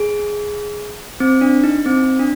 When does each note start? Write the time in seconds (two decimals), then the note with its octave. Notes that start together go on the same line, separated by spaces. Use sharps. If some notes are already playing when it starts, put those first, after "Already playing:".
Already playing: G#4
1.20 C4
1.41 D4
1.64 D#4
1.86 C4
2.19 D4